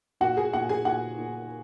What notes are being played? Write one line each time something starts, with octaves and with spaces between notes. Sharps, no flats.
A#2 F#4 F#5
G#4 G#5
A#2 F#4 F#5
G#4 G#5
A#2 F#4 F#5
A#2